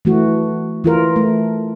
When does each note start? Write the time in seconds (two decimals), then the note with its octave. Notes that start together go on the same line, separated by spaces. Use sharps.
0.05 E3 A3 F#4
0.84 E3 F4 A#4
1.16 A3